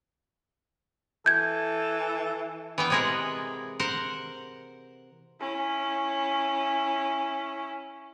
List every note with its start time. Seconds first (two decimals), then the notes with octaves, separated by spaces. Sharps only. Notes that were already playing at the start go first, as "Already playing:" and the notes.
1.26 E3 A4 G6 G#6
2.78 E3 B3 G5
2.90 C3 G#3 G#4 A#4 F#5
3.80 A#4 C5 F#5
5.40 C#4 E4